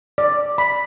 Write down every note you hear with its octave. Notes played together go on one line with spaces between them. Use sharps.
D5
B5